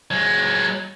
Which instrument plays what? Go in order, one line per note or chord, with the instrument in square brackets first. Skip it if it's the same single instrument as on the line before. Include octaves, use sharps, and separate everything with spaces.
[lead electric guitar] F#3 G#3